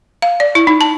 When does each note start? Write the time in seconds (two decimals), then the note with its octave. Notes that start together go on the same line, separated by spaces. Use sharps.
0.22 F5
0.40 D5
0.55 E4
0.67 D#4
0.81 A5